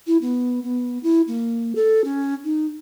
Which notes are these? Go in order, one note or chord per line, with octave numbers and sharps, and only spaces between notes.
E4
B3
B3
E4
A#3
A4
C#4
D#4